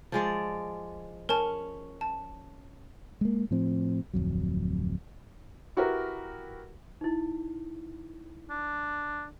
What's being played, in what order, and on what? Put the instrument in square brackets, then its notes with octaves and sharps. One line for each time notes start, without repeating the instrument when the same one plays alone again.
[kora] F3 G#3 D5
[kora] C#4 [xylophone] A#4 A5
[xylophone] A5
[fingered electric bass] G#3 A#3
A2 F3 C4
D1 F2 F#3
[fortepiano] E4 F#4 G4 A#4 B4
[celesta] D#4 E4
[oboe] D4